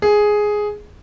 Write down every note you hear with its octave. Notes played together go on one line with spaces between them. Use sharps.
G#4